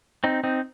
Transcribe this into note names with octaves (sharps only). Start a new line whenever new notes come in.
C4 D#4
C4 D#4